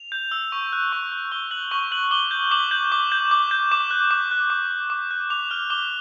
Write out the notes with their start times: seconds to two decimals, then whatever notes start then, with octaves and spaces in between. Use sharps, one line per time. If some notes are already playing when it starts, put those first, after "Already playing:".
Already playing: F7
0.12 G6
0.31 E6
0.52 C#6
0.73 F#6
0.92 C#6
1.12 F#6
1.31 C#6 G7
1.51 F#6 F#7
1.71 C#6 G7
1.91 F#6 F#7
2.11 D6 G7
2.31 G6
2.51 D6 F#7
2.71 G6
2.92 D6
3.12 G6
3.31 D6
3.51 G6
3.72 D6 E7
3.91 F#6
4.11 D6
4.31 F#6
4.50 D6
4.70 F#6
4.90 D6
5.11 F#6
5.30 D6 F7
5.50 F6 G7
5.70 D6 G7